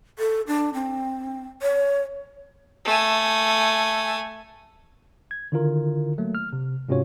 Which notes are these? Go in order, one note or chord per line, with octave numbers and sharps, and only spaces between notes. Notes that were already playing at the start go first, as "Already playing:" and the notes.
A4
D4
C4
C#5
A3 G#5
G#6
D3 D#3 E4 F4 A#4
F#3 A3 A#3
F6
C3
G#2 C3 C#4 F4 F#4 C#5